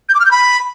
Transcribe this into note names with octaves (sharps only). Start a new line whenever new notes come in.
G6
D6
F6
G6
B5